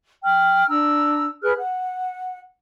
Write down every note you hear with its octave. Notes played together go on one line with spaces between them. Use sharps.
G5 F6
D4 A#5 E6
G#4 B4 F6 F#6
F#5